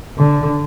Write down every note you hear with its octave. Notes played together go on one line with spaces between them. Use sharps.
D3